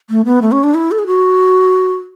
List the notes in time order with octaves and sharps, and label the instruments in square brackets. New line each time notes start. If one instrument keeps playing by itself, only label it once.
[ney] A3
B3
A3
C#4
D4
E4
A4
G#4
F#4